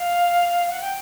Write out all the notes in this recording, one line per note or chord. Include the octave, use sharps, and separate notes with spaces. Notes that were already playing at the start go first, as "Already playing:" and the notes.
Already playing: F5
F#5
G5